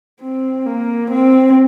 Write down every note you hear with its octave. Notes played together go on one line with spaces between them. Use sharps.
C4
A#3
C4